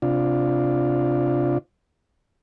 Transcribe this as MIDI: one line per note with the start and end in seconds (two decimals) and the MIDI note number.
0.02 1.58 48
0.02 1.58 62
0.02 1.58 65